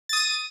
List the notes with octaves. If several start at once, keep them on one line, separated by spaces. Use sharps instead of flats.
D#6 A6 D#7